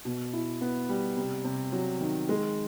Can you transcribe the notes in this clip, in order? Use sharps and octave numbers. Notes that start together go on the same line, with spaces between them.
B2
E4
B3
G3
C3
C3
F#3
D#3
G#3